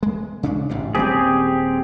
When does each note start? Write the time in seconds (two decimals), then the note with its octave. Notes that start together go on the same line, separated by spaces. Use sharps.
0.03 G#3
0.43 C#3 C#4 D4
0.69 A1 G#2 B2
0.95 D#1 G3 C4 C#4 G4 G#4